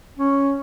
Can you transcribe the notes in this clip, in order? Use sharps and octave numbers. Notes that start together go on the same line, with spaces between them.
C#4